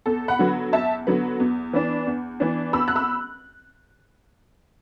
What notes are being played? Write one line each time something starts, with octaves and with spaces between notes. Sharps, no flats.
E2 A4
F#5 B5
D3 F#3 B3
E2 E5 A5
D3 F#3 B3
E2
E3 B3 D4
E2
E3 B3 D4
E2 B5 E6
F#6
B5 E6